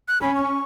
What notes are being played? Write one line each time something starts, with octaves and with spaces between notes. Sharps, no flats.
F#6
C#4 B5
C#6